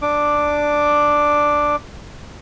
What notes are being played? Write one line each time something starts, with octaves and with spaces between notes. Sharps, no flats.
D4 D6